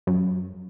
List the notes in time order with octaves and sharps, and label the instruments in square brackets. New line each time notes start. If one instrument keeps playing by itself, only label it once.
[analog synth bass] F#2